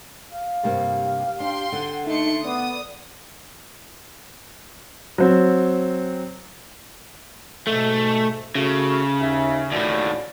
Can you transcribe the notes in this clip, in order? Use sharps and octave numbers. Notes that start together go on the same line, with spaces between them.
F5
G2 C3 A#3 G4
D4 G5 C6
D3 F#5
A3 D#4 C6 C#7
B3 D5 D#6
F#3 C4
G#2 B2 A3
C#3 A3 E4 F#4
D#2 E5
D#2 A2 C#4 F#4 D5